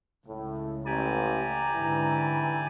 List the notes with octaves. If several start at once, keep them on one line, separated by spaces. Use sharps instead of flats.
C#2 A2
A1 G4 D5 G#5 A#5
G#2 D3 E3